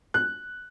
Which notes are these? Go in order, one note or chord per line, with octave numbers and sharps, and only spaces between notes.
F#6